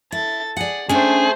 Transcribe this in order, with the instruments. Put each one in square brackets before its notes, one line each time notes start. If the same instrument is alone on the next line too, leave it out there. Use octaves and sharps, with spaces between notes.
[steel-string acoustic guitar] E4 [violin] A4 A6
[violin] G#4 [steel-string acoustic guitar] D5 F#5
[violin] A3 C5 [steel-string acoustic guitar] C#4 D4 G5 [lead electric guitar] G#4